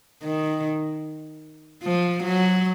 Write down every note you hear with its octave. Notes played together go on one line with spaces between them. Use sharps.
D#3
F3
F#3